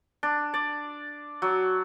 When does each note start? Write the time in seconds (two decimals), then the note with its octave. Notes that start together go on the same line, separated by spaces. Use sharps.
0.23 D4
0.54 D5
1.42 F#3